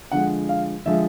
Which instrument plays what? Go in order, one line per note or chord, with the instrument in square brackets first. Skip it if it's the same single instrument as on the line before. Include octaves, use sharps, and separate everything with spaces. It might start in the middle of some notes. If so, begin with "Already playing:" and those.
[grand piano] D3 F3 G#3 F#5
F5
D3 F3 G#3 E5